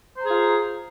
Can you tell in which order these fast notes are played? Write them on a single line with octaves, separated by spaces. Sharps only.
C5 A#5 G#4 F4